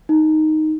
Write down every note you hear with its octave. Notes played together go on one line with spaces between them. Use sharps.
D#4